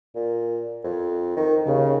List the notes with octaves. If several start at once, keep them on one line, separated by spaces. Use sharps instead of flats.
A#2
F2
D#3
D#2 C#3